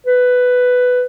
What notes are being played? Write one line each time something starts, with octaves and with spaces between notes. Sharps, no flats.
B4